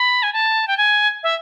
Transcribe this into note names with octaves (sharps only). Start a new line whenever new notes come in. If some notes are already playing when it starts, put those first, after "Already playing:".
Already playing: B5
G#5
A5
G5
G#5
E5